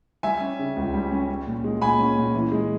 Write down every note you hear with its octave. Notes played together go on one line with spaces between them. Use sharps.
G3 E5 G#5
C#4
C#3
C#2
G3
C#4
C#4
A#2
G#3
A#2 G#5 B5
C#4
A#2
E3
G#3